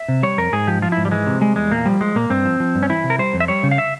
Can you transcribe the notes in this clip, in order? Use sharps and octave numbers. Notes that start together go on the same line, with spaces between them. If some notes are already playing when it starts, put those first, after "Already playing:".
Already playing: E5
C3
G3 C#5
F2 A#4
G#2 G#4
F3 G4
F3 F4
E4
G#2
G3
E3 G#3
C3
G3 G#3
E2 G#3
A#2 A#3
F3 G3
F3 G#3
A#2 A#3
G2 C4
F3
F3
G2
C#4
E3 E4
C3
A#4
G3 C5
F2
E5
G3 C#5
C#3
F5
E5